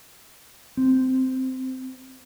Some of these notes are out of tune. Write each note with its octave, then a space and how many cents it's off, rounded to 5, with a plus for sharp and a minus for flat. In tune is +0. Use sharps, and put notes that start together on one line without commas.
C4 -10